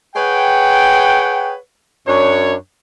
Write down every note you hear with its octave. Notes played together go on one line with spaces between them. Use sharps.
G#4 B4 C#5 F#5 G5
F#2 D4 C#5